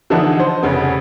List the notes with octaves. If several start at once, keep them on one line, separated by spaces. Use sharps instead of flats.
D3 E3 F3 B3 D4 D#4
C5
F1 C#3 B3